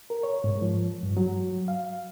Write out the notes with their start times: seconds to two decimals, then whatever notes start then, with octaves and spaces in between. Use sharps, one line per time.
0.10 A#4
0.23 C#5
0.44 G#2
0.62 F3
1.03 G2
1.17 F#3
1.68 F5